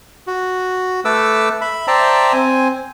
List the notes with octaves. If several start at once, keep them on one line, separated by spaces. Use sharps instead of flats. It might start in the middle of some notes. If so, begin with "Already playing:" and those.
F#4
A3 A4 B4 D6 E6
E5 B5
C5 D5 E5 G5 A5 A#5
C4 G#5